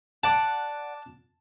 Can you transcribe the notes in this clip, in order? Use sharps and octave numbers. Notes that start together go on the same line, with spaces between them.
D5 F#5 A5